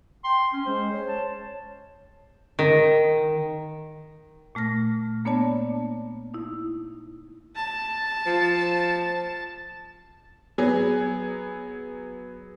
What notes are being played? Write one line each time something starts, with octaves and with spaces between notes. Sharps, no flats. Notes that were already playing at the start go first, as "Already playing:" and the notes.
G5 C6
C#4 G#5
G#3 C5
C#5
A5
D#3
A#2 A3 F6 A#6
A#3 B3 D4 C#5 D5 A5
D#4 E4
A5
F3
F#3 B3 G#4